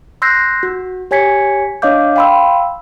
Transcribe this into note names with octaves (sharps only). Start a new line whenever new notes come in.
C6 E6 F#6 G6 A#6 C7
F#4
G4 C#5 G#5 G#6 B6 C#7
D4 C#5 D#5 F5 D6 G6
F5 G5 B5 C6 E6